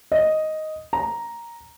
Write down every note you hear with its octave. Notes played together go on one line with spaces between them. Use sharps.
D#5
A#5